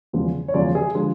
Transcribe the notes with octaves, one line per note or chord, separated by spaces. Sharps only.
E2 C#3 F3 G#3
C#5
E2 C#3 F3 G#3 D5
G#4
D3 F3 G#3